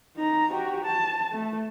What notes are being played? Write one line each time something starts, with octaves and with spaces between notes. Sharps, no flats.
D#4 A#5
F#4 G4
A5
A3